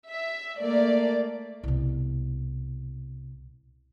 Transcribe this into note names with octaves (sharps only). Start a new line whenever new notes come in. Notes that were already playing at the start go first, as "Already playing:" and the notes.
E5
A3 A#3 D5
C2 B2